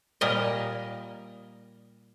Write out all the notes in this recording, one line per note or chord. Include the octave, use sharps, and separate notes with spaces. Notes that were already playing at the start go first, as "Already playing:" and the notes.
A#2 G3 A#4 D#5